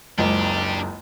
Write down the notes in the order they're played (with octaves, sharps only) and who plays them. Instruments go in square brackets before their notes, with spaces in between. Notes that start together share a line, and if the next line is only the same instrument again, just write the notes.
[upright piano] F#1 C#2 [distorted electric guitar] D4 G4